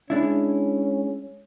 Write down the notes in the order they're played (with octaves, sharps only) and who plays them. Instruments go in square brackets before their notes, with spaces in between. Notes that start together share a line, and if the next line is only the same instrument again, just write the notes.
[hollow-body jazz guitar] G#3 D4 E4 [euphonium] C#4